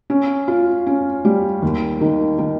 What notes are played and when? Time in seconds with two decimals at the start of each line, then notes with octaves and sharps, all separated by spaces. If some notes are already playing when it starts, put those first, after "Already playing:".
0.10 C#4
0.48 F4
0.87 C#4
1.25 G3
1.62 D#2
2.01 D#3
2.38 D#3